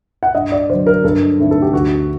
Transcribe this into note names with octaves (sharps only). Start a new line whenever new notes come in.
F#5
G2 D#5
D5
D3 F#3 C5
A#4
G2 A4
D3 A3 C4 D#4
A4
G4
D2 F#4